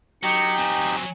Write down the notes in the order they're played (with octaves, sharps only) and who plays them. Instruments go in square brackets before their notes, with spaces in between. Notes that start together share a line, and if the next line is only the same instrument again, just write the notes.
[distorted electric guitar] F#3 [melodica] D#4 G4 [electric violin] C#7
[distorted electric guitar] F#3 C4 [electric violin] G#5